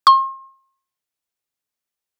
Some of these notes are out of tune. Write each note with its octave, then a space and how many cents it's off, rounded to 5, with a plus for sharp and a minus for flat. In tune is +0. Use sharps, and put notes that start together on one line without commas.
C6 +40